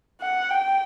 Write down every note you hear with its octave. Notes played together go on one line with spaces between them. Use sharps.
F#5
G5